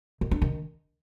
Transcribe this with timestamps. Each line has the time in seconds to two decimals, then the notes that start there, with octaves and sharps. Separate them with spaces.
0.21 D#3
0.31 D4
0.42 D#3